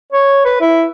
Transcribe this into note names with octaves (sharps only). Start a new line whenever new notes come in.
C#5
B4
E4